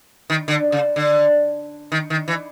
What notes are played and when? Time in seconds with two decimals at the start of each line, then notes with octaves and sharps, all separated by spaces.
0.30 D#3
0.48 D3
0.72 C#3
0.96 D3
1.92 D#3
2.10 D#3
2.28 E3